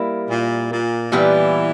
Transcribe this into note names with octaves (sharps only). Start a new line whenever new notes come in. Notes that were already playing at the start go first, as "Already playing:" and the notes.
Already playing: G3 A#3 E4
A#2
A#2
A#2 E3 G3 B3 G4